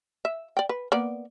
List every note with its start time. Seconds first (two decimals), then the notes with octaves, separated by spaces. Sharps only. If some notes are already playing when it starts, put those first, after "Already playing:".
0.25 E5
0.57 D5 G5
0.69 B4
0.92 A#3 B3 D5